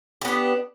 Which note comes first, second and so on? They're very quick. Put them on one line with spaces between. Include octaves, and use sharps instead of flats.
G4 B3 D4